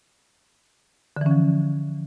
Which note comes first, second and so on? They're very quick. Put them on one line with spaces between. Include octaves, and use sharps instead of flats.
D3 E3 C#4 F3